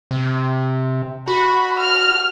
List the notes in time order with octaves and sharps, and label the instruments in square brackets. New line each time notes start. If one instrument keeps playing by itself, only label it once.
[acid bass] C3
[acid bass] F#4 [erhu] B5
[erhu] F6